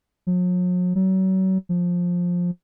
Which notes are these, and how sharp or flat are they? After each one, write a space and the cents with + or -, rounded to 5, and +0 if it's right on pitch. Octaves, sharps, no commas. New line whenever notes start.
F#3 -45
F#3 +35
F3 +15